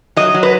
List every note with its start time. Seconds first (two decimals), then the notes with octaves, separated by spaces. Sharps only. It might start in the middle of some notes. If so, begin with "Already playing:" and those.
0.17 F#3 D#5
0.34 F#3
0.43 B4